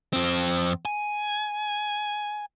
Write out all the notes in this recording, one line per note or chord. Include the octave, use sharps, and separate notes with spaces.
F2 C4
G#5